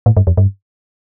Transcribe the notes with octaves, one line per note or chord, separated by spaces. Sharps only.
A2
G2
F2
G2